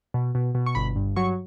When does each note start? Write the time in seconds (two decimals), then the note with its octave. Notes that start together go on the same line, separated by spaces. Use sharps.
0.14 B2
0.35 B2
0.55 B2
0.66 C#6
0.75 G1 B5
0.96 G2
1.16 F#3 C#6